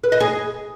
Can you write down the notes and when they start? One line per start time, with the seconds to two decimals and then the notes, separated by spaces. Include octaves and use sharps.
0.04 B4
0.12 D#5
0.20 G#4